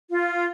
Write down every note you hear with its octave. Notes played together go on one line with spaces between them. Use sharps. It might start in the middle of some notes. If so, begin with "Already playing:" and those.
F4